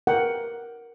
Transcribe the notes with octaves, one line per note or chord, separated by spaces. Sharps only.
A#4 F#5 G5